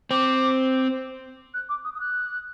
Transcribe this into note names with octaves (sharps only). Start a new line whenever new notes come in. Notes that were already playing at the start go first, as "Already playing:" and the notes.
C4 D6
F#6
D6
D#6
D#6
F#6